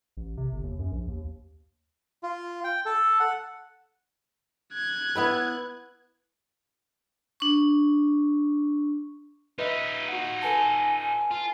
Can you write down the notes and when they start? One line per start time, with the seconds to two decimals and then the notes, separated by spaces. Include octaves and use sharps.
0.17 A1
0.37 C3
0.52 G1
0.63 D#2
0.79 F#2
0.92 A#1
1.08 D#2
2.23 F4
2.64 G5
2.86 A4
3.20 F#5
4.74 F#6 G#6
5.15 B3 E4 B4
7.40 D4 C#6
9.59 D#4 F4 B4 D#5 E5
10.09 F#4 F#5
10.42 A4 B4 G#5 A5
11.31 F4